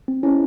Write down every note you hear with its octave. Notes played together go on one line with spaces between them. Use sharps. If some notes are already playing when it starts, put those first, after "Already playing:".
C4
C#4 E4 G#4 C5 D#5